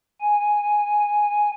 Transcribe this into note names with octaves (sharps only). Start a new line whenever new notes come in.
G#5